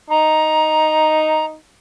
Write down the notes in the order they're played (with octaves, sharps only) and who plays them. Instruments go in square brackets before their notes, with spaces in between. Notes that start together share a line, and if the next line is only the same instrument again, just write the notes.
[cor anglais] D#4 [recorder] A#5